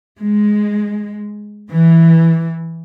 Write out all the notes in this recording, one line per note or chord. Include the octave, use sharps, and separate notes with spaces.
G#3
E3